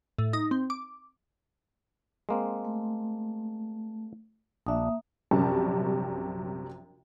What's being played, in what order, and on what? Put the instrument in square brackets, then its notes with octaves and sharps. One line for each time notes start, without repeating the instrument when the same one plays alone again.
[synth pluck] A2
D#4
C4
D6
[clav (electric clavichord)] G#3 A#3 C4
[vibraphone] A3
[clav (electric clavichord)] A#1 D4 [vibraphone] A#3 E5 D#6
[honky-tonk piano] A#1 F#2 C3 G3 C#4 A5